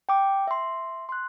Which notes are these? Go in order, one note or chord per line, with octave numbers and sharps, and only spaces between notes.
G5 D6
E5 C6
C6 F#6